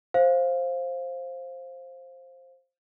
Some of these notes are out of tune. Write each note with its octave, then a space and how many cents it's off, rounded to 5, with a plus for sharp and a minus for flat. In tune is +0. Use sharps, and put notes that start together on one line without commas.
C5 +10 F5 +0